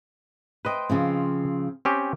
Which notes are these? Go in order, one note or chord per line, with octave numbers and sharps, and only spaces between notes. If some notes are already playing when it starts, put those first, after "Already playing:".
B4 C5 D#5 G5
C#3 F3 C4
C4 C#4 G4